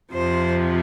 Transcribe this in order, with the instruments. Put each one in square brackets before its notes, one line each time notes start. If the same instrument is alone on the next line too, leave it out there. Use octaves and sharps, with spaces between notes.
[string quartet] F2 C3 F3 C5